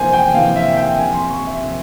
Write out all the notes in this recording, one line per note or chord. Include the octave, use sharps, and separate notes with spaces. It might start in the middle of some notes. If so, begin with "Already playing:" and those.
Already playing: F2 C3 E3 A#3 C5 G#5
G5
F2 C3 E3 A#3 F5
E5
G5
C3 F3 A#3 G#5
C6
C#6
E5
C3 F3 A#3